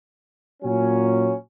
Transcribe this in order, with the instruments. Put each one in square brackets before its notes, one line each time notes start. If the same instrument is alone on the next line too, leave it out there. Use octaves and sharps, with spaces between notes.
[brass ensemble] A#2 F#3 C#4